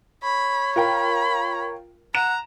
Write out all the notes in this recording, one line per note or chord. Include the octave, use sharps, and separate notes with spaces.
C#5 B5
F4 A#4 G5 B5
F#5 A#5 E7